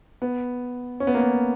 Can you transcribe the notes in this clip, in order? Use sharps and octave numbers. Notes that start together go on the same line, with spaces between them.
B3
C#4
B3
A#3
B3